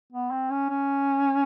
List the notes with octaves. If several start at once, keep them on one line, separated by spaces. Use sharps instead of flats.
B3
C4
C#4
C#4